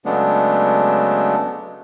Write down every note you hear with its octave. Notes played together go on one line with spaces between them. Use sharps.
C#3 F#3 G#3 A3 B3 D4